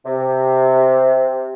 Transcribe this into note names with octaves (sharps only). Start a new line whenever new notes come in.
C3